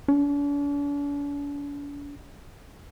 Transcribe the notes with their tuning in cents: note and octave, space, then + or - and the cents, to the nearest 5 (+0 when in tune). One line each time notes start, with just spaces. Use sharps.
D4 -45